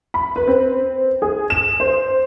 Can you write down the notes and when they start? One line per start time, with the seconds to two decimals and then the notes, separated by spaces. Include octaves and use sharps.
0.14 B5
0.36 B4
0.48 C4
1.22 G#4
1.50 E7
1.80 C5